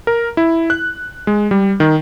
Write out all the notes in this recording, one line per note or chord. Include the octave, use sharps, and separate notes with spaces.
A#4
E4
F#6
G#3
G3
D#3